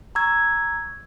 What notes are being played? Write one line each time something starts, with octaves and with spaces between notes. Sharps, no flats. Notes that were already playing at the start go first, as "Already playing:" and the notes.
A#5 C#6 E6 G#6